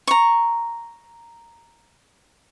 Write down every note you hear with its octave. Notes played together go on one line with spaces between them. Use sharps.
A#5 C#6